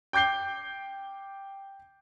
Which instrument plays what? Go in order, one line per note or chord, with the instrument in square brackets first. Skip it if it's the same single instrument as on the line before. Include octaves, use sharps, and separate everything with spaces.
[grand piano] G5 D6 G6 C7 G7